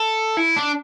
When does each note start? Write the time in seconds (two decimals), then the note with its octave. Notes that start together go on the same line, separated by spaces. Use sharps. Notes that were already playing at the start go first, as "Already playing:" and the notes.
Already playing: A4
0.37 E4
0.57 D4